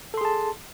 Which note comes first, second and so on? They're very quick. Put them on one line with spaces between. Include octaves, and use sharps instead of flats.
A4 C6 G#4 A5